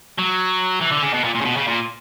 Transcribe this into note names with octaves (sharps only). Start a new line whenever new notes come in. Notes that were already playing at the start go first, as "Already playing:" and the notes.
F#3
E3
D3
C#3
B2
A#2
A#2
C#3
B2
C#3
A#2